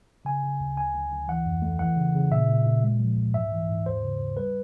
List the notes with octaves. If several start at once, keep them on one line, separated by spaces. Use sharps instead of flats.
C#3 G#5
C#3
D2
D2 G#5
D2
D2
E3 F#5
F2
A3
E3 F#5
C#3
C#3
A#2 E5
A#2
A#2
G#3
F3
C#2
G#2 E5
E3
G#2
D#2 C5
C#3
D#2
G3 B4